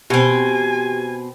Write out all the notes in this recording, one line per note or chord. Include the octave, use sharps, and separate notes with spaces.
B2 C4 G4 G#5